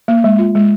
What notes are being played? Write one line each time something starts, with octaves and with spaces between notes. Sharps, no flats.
A#3
G#3
F4
G#3